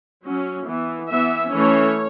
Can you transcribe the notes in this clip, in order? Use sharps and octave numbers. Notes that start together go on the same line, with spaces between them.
F#3 C#4
E3 B3
E3 B3 E5
E3 A3 C#4 C#5